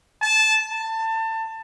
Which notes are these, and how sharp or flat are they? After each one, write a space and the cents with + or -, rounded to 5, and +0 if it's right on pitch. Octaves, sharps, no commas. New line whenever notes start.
A5 -15
A5 +25